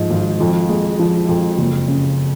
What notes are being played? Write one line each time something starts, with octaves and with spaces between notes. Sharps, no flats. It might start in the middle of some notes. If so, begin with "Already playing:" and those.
Already playing: G#2 F3
G#1
F2
G#3
F3
F2
F#1
C#3